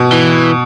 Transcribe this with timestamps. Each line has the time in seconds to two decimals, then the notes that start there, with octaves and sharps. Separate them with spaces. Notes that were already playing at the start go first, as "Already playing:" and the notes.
Already playing: B2
0.12 E3